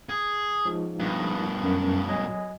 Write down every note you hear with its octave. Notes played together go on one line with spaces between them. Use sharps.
G#4
F3 G#3 D#4
G2 B2
F#2
F#3 D#5 G#5